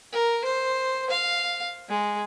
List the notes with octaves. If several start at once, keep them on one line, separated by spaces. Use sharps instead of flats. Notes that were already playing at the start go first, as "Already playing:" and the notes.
A#4
C5
F5
G#3